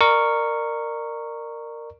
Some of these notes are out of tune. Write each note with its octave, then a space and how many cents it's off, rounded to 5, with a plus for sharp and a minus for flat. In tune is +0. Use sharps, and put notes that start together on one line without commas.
A#4 -10 D5 +30 C#6 +0